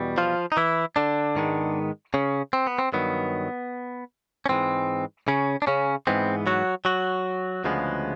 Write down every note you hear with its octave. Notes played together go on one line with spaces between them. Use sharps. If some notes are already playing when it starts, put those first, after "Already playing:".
Already playing: E2 B2 G3
F3 F4
D#4
E3 E4
D3 D4
G#2 D#3 G#3 B3
C#3 C#4
C4
B3
C4
G2 D#3 F#3 B3
C#4
G#2 E3 G#3 C4
C#3 C#4
D4
C#3 C#4
G#2 E3 G#3 B3 C4
F#3 F#4
F#3 F#4
D2 C#3 F3 G#3 B3